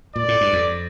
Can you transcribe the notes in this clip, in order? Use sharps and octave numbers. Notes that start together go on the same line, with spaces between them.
A#2 D5
A2
G2
F2